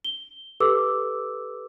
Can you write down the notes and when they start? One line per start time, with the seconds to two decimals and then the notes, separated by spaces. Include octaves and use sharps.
0.04 G7
0.60 G4 A4 B4 D6 E6